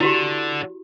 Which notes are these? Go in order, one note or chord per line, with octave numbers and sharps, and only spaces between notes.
D3 E4 F#4 G4